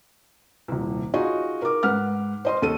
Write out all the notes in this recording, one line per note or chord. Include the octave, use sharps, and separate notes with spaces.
D#1 C2
D#4 F4 F#4 G#4 D#5
A#4 D6
G#2 B4 F#5 F6
C5 D#5 C6
D#2 A4 D#7